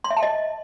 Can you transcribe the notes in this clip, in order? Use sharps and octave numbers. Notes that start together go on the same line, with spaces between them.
C6
E5
A5
D#5